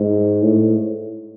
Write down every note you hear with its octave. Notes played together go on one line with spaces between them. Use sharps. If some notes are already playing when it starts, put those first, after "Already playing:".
Already playing: G#2
A2